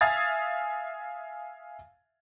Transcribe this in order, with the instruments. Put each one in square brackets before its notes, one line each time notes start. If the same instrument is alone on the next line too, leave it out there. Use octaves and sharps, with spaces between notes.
[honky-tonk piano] E5 F5 G#5 D#6 G#6 A6